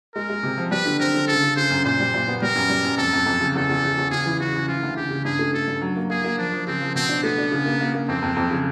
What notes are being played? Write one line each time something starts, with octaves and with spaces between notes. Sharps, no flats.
G#3 A#4
G#3
C3
F3
G3 B4
D3
C4 A#4
D3
C#3 A4
C#3
C#3 C5
F#2
A#2 C5
G3
A#2
B3
G3 A#4
F#2
G3
F#2
F2 A4
F2
F2
C#3
E2 A4
E2
E2
E2
C#3 G#4
E3
C#3 F#4
C#3
E3 F4
D2
C#3 G4
C#3
G2 G#4
A3
A3 A4
G2
F#3
A#3
A#3 G#4
A#3
F3 D4
F3
C#3 C4
F3
B2 C4
D4
A3 B3
D4
C#3
A#3
A#3
A#3
F2 C4
F2
F2
C#3